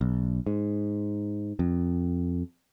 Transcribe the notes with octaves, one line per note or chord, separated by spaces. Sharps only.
B1
G#2
F2